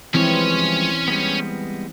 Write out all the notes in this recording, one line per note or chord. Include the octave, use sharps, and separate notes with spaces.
E3 F3 G3 G#3 C4 C#4 E4 C#5
G3 G#3 B3